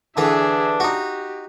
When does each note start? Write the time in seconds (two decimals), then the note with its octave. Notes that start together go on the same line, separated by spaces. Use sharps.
0.17 D3 E3 D4 G#4 E5 A5
0.80 D#4 F#4 G4